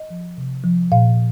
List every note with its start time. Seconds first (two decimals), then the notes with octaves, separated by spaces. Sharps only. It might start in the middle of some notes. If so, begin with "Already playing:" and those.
Already playing: D#5
0.10 F3
0.37 C3
0.64 F3
0.92 A#2 F5